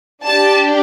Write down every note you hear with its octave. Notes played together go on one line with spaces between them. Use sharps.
D4 G4 A5